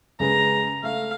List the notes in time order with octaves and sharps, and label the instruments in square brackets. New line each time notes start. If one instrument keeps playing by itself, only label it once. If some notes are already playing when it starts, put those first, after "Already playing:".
[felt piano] C#3 G#3 B4 [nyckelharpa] A#5
[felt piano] A3 [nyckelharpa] F5